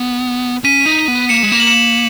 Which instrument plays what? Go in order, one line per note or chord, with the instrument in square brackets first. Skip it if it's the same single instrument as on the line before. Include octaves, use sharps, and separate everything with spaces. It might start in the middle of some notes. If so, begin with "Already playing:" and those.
Already playing: [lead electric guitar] B3
[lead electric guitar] C#4 [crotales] B6 D#7
[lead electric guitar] D#4
B3
[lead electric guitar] A#3 [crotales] C#7 E7
[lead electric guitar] G#3
[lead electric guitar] A#3 [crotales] E7
[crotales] F#7
C#7 E7